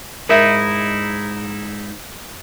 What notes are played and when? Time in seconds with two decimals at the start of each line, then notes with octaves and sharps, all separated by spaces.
0.29 G#2 D#4 E4 A#4 E5